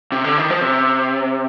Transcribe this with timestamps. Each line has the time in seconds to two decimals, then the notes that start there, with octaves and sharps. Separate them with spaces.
0.12 C3
0.24 D3
0.38 D#3
0.50 F3
0.61 C3